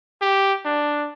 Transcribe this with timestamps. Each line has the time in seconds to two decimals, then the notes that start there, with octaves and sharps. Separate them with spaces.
0.22 G4
0.65 D4